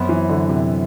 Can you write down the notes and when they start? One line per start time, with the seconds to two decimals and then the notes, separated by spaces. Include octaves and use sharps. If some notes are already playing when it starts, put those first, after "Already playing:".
Already playing: F#2 F#3 B3 C4
0.09 E3
0.29 D3
0.49 C3